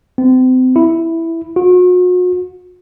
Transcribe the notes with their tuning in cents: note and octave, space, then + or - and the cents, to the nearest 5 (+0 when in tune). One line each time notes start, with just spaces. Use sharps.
C4 -35
E4 +0
F#4 -40